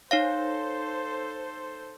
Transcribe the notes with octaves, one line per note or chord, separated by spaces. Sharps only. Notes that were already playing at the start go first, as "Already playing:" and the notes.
D#4 A4 C5 C#5 F5